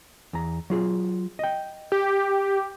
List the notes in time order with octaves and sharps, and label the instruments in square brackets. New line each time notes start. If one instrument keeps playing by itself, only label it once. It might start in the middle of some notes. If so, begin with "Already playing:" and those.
[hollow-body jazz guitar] E2 A#5
F#3 F4 G#4
D#5 G5
[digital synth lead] G4